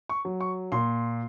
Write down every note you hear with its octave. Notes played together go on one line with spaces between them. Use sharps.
C#6
F#3
C#6
A#2 C6